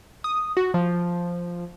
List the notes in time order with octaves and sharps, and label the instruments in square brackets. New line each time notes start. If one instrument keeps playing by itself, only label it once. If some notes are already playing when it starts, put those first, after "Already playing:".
[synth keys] D#6
F#4
F3